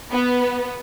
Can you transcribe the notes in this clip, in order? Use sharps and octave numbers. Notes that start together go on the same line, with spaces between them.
B3